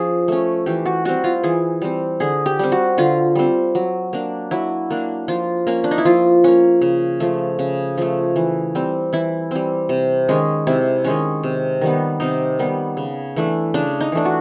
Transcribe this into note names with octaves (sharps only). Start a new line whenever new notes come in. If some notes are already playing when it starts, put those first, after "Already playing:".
Already playing: F3 C#4 G#4
A3 C#4
E3 G4
F#4
G3 C4 F#4
F4
E3 G#4
G3 C4
D3 G#4
G4
G3 C4
F#4
D3 F4
G3 C4
F#3
A#3 D4
F#3 E4
A#3 D4
F3 F4
A#3 C#4
D4
D#4
E4
F3 F4
A#3 C#4
C#3
F3 A3
C#3
F3 A3
E3
G3 C4
E3 E4
G3 C4
C3
D#3 G#3 C#4
C3 E4
D#3 G#3 C#4
C3
D#3 G3 B3
C3 D#4
D#3 G3 B3
C#3
E3 A3 D4
C#3 D4
D#4
E3 A3 D4
F#4